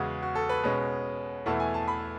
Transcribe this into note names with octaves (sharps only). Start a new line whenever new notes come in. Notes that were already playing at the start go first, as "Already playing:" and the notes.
Already playing: E2 C#3 G#3 F#4
F#4
A4
B4
B2 G#3 C#4
E2 B2 A3 E4 A5
G#5
A5
B5